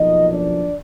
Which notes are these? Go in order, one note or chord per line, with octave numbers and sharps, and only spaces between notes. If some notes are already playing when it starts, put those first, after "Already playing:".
Already playing: B1 A#2 F3 D#4 D#5
D4 D5